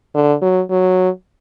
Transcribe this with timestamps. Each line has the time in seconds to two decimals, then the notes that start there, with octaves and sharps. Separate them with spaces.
0.15 D3
0.42 F#3
0.70 F#3